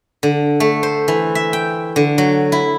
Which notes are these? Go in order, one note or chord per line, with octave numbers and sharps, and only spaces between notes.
D3
A3
C5
E3
E5
G5
D3
F#3
E4